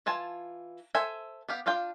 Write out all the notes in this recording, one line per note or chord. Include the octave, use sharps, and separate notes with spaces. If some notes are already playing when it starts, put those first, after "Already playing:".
E3 F4 G#5 A5
A4 C5 E5 G#5
B3 G4 F5
D4 F4 F5 G5